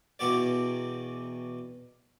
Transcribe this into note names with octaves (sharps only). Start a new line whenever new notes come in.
E2 B2 F#4 G4 D5